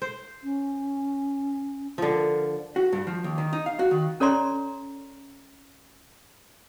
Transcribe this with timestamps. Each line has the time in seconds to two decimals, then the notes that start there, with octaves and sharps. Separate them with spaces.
0.02 C5
0.43 C#4
1.98 D3 F3
2.13 A#4
2.76 F#4
2.93 G2
3.07 F3
3.24 D#2
3.38 D#3
3.53 D#4
3.66 F5
3.79 F#4
3.91 D#3
4.20 C#4 A4 C#5 D5 A#5 C6